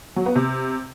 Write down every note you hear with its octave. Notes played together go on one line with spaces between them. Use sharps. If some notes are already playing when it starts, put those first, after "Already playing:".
F#3
B3
C3